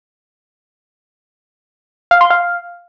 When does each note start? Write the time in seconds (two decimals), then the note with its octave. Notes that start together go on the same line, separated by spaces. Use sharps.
2.11 F5
2.21 C6
2.30 F5